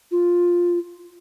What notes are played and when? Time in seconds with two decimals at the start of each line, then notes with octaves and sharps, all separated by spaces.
0.12 F4